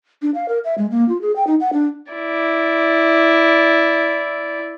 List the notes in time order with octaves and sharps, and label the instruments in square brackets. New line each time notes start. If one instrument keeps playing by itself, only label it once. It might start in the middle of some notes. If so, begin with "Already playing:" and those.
[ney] D4
F5
A#4
E5
G#3
A#3
F4
G#4
G5
D#4
F#5
D4
[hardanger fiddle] E4 D5